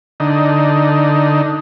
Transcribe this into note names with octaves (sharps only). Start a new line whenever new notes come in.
D3 D#4